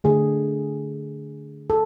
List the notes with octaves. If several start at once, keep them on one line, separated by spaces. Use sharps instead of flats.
D3 A3 G#4
A4